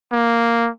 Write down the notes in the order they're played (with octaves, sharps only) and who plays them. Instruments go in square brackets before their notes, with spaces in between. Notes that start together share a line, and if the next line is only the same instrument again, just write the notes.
[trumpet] A#3